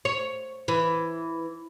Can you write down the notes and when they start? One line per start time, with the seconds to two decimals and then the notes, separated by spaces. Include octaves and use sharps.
0.05 C#5
0.68 E3